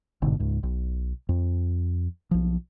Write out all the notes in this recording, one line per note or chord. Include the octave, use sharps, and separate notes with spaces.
G1 G#2 B2 D3
C#2 G#2
B1
F2
B1 F3